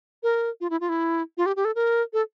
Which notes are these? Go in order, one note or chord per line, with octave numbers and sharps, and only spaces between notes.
A#4
F4
E4
F4
E4
F4
G4
G4
A4
A#4
A4